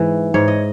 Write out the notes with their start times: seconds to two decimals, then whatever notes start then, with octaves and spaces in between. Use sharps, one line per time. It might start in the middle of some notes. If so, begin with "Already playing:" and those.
Already playing: G#2 E3 B4
0.34 G#2 C#5
0.48 D#5